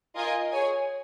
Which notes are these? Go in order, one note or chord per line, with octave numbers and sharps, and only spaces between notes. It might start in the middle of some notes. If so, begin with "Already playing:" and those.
F4 A#4 D#5 G#5
G#4 C#5 G#5